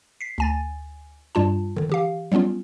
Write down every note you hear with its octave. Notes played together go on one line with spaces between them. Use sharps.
B6 C7
D2 G#5 A6
G2 G3 F4 A5
D3 D#3
E3 G4 F5
F#3 G3 B3 C#4 F4